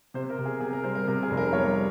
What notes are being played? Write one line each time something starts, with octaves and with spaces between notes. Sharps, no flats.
C3 C5
A#4
C3
G#4
C3 G#4
A#4
G3 C5
A#4
C3 A#4
G#4
F1
A#4
G3 C#5